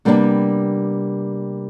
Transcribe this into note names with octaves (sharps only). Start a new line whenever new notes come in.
C3 G3 A#3 B3 C#4 D4